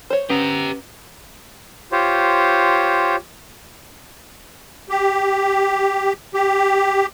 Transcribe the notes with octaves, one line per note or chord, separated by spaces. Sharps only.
C5 C#5
C#4 G4 B4 A#5
F4 G4 C5 C#5
G4
G4